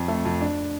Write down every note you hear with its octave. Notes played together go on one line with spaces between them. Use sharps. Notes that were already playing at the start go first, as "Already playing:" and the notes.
Already playing: F2
A3
F2
D4